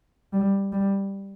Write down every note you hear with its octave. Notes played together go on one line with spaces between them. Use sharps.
G3
G3